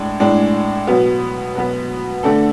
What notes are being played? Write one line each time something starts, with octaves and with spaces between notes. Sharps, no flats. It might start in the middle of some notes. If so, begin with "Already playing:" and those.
Already playing: A2 G#3 D4
A2 G#3 D4
B2 F#3 B3
B2 F#3 B3
D3 A3 D4 A4